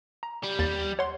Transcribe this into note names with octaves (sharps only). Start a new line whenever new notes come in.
A#5
G3
D#2 A6
C#5 F#5 C6